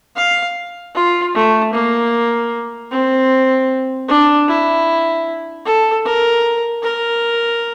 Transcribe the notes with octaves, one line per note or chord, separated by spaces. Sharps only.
F5
F4
A3
A#3
C4
D4
E4
A4
A#4
A#4